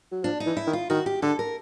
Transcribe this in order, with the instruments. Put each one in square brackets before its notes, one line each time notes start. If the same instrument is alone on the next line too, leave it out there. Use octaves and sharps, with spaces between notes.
[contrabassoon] F#3
[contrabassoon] F3 [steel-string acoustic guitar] D4
[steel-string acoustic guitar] D#4
[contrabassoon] E3
[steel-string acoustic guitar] E4
[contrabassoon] D#3
[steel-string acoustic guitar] F4
[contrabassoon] D#3 [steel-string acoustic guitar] F#4
[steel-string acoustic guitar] G4
[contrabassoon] D3 [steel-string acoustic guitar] A4
[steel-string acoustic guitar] A#4